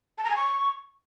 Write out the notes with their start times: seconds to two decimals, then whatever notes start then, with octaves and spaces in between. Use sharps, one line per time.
0.18 A5
0.24 A#5
0.30 G#5
0.36 C#6